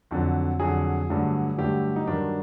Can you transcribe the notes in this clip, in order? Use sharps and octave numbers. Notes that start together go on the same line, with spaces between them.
F2 D3 F#3
F2 D3 F#3 G#4
G2 D3 F#3 A3
G2 D3 F#3 A3 G4
D#4
G2 D#3 F#3 D4